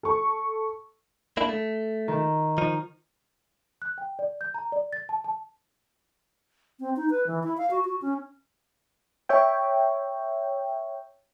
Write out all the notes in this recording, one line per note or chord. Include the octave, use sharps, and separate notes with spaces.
A4 C#6
A#3 D4 E4
A3
D#3
F3 D#4
F#6
G5
D5
G6
A#5
D5
A6
A5
A5
C4
D#4
B4
E3
E4
F5
F#4
F#4
C#4
C#5 E5 G5